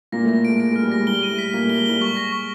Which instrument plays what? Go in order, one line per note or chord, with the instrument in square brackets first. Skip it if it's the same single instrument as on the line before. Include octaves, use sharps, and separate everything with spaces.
[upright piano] A#2 A#3 [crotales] A#6
[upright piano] A2 A3 [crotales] A#6
[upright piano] G#3 [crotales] D7
[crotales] D7
[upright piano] G#3 [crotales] F6
[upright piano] G3
[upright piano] G#3 [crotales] A#6
[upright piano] G3 [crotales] G7
[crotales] D#7
[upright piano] A2 A3
[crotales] B6
[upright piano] A#2 A#3 [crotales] G7
[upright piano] A2 A3 [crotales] G7
[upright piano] G#3
[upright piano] G3 [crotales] G7
[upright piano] G#3 [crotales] C#6
[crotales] A#6
C#6